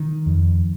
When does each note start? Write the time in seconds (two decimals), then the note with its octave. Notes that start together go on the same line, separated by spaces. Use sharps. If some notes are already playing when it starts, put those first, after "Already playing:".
Already playing: D#3
0.26 F2